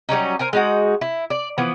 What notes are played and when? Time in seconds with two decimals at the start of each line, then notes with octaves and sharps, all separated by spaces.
0.09 F#3 G3 C#4 D#4
0.39 A#4 C5 G#5
0.53 G#3 D#4 F#4
1.01 E4
1.30 D5
1.58 E3 F3 B3